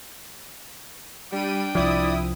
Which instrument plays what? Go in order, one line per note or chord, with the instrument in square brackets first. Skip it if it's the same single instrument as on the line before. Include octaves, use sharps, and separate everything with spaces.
[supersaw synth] G3 D#7 [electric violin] D4 G5
[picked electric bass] C2 F3 [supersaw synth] E4 D#6 [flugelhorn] D5